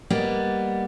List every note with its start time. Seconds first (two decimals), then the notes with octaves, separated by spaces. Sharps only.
0.10 G3 A#3 B3 D5 D#5